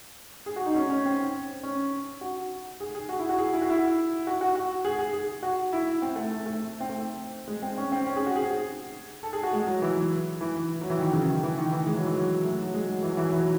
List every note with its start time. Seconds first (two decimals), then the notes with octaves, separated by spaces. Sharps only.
0.46 G#4
0.56 F#4
0.66 D#4
0.75 C#4
0.90 C#4
1.05 C4
1.63 C#4
2.21 F#4
2.80 G#4
2.95 G#4
3.09 F#4
3.19 E4
3.29 F#4
3.38 G#4
3.53 E4
3.62 F#4
3.70 E4
4.27 F#4
4.41 F#4
4.55 F#4
4.85 G#4
4.99 G#4
5.13 G#4
5.43 F#4
5.73 E4
6.02 C4
6.16 A3
6.31 A3
6.46 A3
6.80 C4
6.89 A3
7.48 G#3
7.62 C4
7.77 C#4
7.92 C4
8.06 C#4
8.16 G#4
8.26 F#4
8.36 G#4
8.50 G#4
9.23 A4
9.33 G#4
9.43 F#4
9.53 G#3
9.67 F#3
9.82 E3
10.41 E3
10.81 F#3
10.90 E3
10.99 D#3
11.13 C#3
11.28 D#3
11.43 E3
11.57 D#3
11.72 E3
11.87 G#3
11.95 F#3
12.05 E3
12.14 F#3
12.44 A3
12.62 F#3
12.74 G#3
12.89 F#3
13.03 E3
13.10 F#3
13.17 E3
13.25 F#3
13.32 E3
13.38 F#3